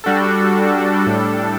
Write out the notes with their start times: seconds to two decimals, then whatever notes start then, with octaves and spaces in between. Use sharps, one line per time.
0.04 G3 D4 F#4 A4
1.07 A2 G3 D4 A4